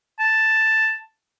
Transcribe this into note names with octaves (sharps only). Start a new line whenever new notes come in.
A5